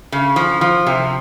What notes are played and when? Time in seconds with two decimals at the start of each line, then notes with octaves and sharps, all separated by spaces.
0.12 C#3
0.36 F3
0.61 F3
0.87 C3